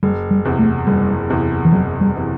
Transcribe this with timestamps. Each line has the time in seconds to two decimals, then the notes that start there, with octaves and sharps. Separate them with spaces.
0.03 F#1 G3
0.31 G3
0.45 E2 C3 E3
0.59 A3
0.87 F#1 G3
1.30 E2 C3 E3
1.65 E3
1.72 F#1 F#3
2.01 G3
2.17 C3 E3